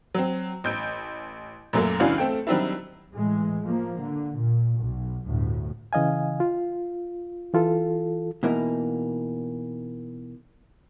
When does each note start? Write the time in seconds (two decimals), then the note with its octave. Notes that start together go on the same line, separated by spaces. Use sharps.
0.14 F#3 C4
0.64 A1 G6 D7
1.73 F#2 A#2 F#3 A3 A#3
2.00 C#2 E3 C#4 D4 F#4 F5
2.18 A3 C4 A4 G5
2.47 D#3 F#3 G3 C4 D4 E4
3.14 A2 E3 G#3
3.64 F3 A#3
4.00 D3
4.36 A#2
4.79 B1
5.25 G1 D2 A2
5.93 C#3 E3 D#5 F5 G#5
6.40 F4
7.53 E3 F4 A4
8.43 B2 E3 A#3 D#4